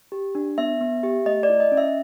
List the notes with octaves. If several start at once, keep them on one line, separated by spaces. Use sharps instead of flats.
G4
D4
B3 E5
B3
G4
A3 D#5
D5
E4
D#5
C#4
E5